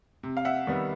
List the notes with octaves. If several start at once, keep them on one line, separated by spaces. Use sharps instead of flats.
C3
F5
E5 F#5
D#3 G3 B3